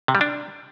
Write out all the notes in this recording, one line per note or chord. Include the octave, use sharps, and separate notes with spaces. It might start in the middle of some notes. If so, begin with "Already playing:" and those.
C3
G3
D4